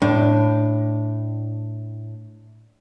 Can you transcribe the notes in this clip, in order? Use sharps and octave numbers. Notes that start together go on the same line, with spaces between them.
A2 D4